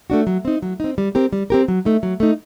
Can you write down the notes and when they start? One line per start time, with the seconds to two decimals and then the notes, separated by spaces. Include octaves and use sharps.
0.10 A3 D4 F#4
0.27 F#3
0.45 C4 D#4
0.62 F#3
0.80 C4 D#4
0.98 G3
1.15 C4 G4 A#4
1.33 G3
1.50 C4 G4 A#4
1.68 F#3
1.85 A3 D#4
2.03 F#3
2.20 A3 D#4